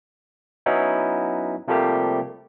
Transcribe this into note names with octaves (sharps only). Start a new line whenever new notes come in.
F#3 B3 C#4 D#4 E4
C3 F3 G3 A3 A#3 G4